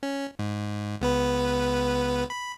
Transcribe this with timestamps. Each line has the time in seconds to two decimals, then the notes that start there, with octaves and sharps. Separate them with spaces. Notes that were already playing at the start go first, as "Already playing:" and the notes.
0.03 C#4
0.39 G#2
1.01 C#2 B3 B4
2.30 B5